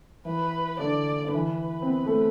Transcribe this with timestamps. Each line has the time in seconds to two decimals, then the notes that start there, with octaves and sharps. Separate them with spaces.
0.25 E3 B4
0.79 D3 D5
1.25 D3
1.34 E3 B4
1.82 C4
1.88 B3
2.06 A3